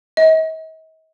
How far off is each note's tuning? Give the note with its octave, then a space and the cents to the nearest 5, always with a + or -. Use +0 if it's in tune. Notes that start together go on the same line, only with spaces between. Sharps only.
D#5 +45